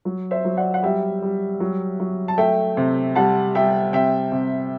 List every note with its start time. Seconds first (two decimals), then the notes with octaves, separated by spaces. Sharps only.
0.05 F#3
0.31 C5 E5
0.45 F#3
0.57 D5 F#5
0.74 F#5
0.83 G3 E5 G5
1.22 G3
1.60 F#3
2.00 F#3
2.28 A5
2.38 A3 E5 G5
2.77 C3
3.15 G3 F#5 A5
3.55 G3 E5 G5
3.93 C3 E5 G5
4.32 C3